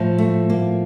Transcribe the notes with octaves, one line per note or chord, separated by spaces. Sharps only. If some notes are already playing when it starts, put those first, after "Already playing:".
Already playing: A2 F3
A3
A#3